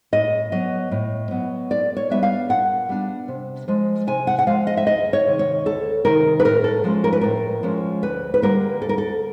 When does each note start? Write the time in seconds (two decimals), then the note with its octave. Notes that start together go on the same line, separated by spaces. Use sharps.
0.12 A2 D#5
0.52 F#3 B3 D#5
0.91 A2
1.31 F#3 B3
1.70 A#2 D5
1.97 C#5
2.10 G3 B3 D4 E5
2.23 F5
2.49 A#2 F#5
2.89 G3 B3 D4
3.28 C3
3.68 F3 G#3
4.07 C3 G#5
4.27 F#5
4.39 F#5
4.47 F3 G#3 F5
4.67 D#5
4.77 E5
4.86 D2 D#5
5.13 C#5
5.26 C3 D#3
5.39 C#5
5.66 D2 A4
6.05 C3 D#3 A#4
6.40 B4
6.45 A2 A#4
6.64 A4
6.84 F3 G#3 C#4
7.04 A#4
7.13 B4
7.21 A2 A#4
7.63 F3 G#3 C#4
8.02 D2 B4
8.34 B4
8.42 D3 G3 A#3 A#4
8.82 D2 A4
8.89 A#4
8.98 A4